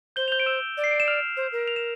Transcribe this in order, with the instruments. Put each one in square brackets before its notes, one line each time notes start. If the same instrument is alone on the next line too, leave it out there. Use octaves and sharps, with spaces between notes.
[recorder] C5 [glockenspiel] G6 G7
[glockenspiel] F7
G6 G7
D7
E6 E7
[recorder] D5
[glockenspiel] C7
D7
E7
F6 F7
[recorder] C5
A#4
[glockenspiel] F7
E7